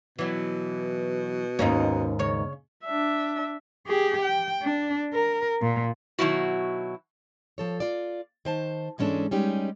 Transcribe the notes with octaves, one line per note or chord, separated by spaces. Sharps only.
B2 E3 F#3
D#2 G#2 A#3 C#4 D#4
C#3 C#5
D4 E5
G4 G#4
G5
D4
A#4
A#2
B2 D#3 F#3 E4 F#4
F3 A4 C#5
F4 D5
D#3 C5 A5
G#2 E3 G#3 C#4 D4 A4
G3 G#3 C#4 D#4 G4